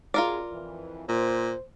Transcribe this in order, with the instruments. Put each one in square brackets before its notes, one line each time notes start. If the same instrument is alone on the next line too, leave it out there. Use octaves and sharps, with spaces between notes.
[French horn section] F#2 G#3 [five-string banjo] F4 A#4 D5
[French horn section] F2 E3
[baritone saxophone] A#2 [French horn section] C5